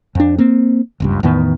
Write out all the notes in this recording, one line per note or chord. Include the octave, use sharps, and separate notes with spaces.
F2 D4
A#3 C4
F#1 C#2 G2
E2 A2 D#3 B3